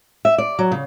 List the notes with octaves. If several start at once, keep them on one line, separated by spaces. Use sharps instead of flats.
E5
D5
F#3
C#3